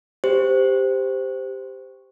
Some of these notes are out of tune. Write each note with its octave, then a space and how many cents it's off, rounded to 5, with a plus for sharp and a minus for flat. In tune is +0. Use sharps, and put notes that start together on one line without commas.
G4 +5 C5 -10